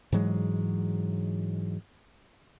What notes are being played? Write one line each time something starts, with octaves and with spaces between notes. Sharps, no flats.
G#2 E3 F#3 G#3